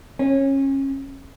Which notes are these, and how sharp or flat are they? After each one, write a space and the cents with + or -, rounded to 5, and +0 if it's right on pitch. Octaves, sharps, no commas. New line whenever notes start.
C#4 -25